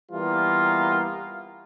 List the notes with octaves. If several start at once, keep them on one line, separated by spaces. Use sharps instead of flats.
E3 G3 A#3 B3 F4